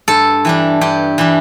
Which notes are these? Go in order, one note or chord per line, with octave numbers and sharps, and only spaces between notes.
G2 A4
E3 G3 D4
G2 G4
E3 G3 D4